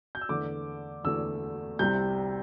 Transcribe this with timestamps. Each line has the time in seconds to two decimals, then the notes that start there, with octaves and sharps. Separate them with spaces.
0.15 G6
0.21 E6
0.29 E2 D3 A3 D6
1.04 E2 D3 A3 E6
1.79 C2 C3 G3 G6